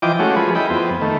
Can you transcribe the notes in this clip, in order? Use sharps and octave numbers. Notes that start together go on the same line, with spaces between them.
E3 F3 D#5 G5 D6
G#3 A3 C#4 F#4
F3 G#4 B4
E4 D#5 G5 B5
F2 B3 C4
D#3 A3